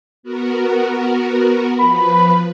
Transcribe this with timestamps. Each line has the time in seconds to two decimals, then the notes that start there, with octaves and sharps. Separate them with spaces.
0.23 B3 F#4 A#4
1.79 F3 B4 B5